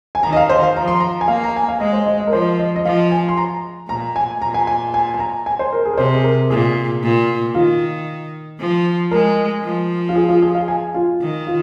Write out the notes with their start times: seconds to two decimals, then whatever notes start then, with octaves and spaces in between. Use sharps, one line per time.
0.15 G#5
0.23 D#3 A#5
0.33 D#5
0.36 F5
0.49 C5
0.63 F5
0.76 F3 A#5
0.88 C6
1.00 A#5
1.21 G#5
1.28 A#3 F5
1.44 A#5
1.56 G#5
1.68 F5
1.80 G#3 D#5
1.93 C5
2.06 D#5
2.20 D#5
2.27 A#4
2.32 F3 C5
2.59 D#5
2.76 D#5
2.85 F3 F5
3.11 G#5
3.29 C6
3.37 A#5
3.89 A#2 A#5
4.16 G#5
4.41 A#2 A#5
4.54 G#5
4.67 G#5
4.94 G#5
5.14 G#5
5.20 A#5
5.46 G#5
5.59 C5
5.72 A#4
5.85 G#4
5.93 A#4
5.98 C3 C5
6.15 G#4
6.24 A#4
6.50 A#2 G#4
7.02 A#2
7.55 D#3 F4
8.59 F3
9.11 G#3 A#4
9.64 F3
10.09 F4
10.15 G#4
10.28 F4
10.42 G#4
10.55 F5
10.68 G#5
10.94 F4
11.20 D#3
11.47 F4